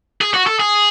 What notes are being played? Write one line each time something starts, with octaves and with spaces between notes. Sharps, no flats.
G#4
F#4
A4
G#4